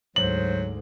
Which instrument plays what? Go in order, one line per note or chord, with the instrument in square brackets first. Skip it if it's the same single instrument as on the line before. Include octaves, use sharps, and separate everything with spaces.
[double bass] D2 G#2 [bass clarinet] F#3 [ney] C5 [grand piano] F#7